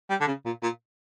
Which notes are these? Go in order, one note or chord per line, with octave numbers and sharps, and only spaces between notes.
G3
D3
C#3
A#2
A#2